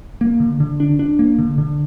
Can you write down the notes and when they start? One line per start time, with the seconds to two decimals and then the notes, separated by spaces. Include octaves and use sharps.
0.21 A#3
0.40 D3
0.60 D3
0.80 D4
0.99 D4
1.19 A#3
1.38 D3
1.58 D3